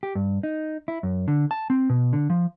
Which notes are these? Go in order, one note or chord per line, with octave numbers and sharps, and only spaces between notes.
G4
G2
D#4
E4
F#2
D3
A5
C4
B2
D3
F3